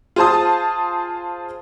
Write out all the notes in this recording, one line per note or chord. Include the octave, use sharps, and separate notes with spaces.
F4 G#4 C5 A5 D#6